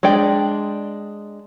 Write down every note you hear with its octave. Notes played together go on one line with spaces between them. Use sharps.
G#3 D4 D5 G5